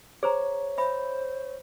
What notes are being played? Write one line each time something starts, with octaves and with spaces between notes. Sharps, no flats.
G#4 C5 C#5 A#5
C5 E5 B5